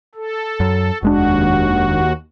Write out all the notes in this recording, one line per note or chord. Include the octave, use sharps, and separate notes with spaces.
A4
F#2
F1 D#2 G#3 D4 F#4